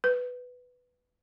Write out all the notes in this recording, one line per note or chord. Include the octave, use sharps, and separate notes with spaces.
B4